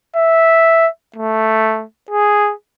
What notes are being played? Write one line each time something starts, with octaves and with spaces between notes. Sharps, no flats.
E5
A3
G#4